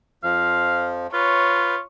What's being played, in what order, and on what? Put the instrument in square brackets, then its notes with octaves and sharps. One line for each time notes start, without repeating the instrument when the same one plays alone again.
[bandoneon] F2 F3 [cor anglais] F5
[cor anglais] F4 [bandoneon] B4 [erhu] C#5